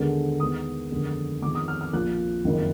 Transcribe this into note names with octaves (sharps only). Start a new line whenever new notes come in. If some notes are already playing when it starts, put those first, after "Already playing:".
Already playing: D#2 D3 G#3 B3
D#2 D#3 G#3 B3 D#6
F1 D#2 D3 G#3 B3
F2 D#3 G#3 B3 D6
D#6
F6
F6
A#1 A#2 F3 A#3 F#6
F#1 F2 D#3 A#3